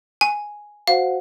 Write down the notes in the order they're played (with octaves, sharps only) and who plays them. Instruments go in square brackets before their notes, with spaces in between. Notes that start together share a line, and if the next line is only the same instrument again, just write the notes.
[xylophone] G#5
[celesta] F#4 C5 F#5 [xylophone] F5